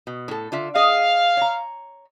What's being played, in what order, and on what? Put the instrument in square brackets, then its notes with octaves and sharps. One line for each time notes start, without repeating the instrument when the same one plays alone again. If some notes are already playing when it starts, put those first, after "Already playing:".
[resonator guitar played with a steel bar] B2
A2 A4
D3 F4 E5
[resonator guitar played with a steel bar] G#4 D#5 [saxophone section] F5
[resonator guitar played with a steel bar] C#5 A#5